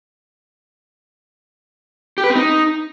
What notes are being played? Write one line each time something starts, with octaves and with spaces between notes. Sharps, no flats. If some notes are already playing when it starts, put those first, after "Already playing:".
G4
B4
C4
D#4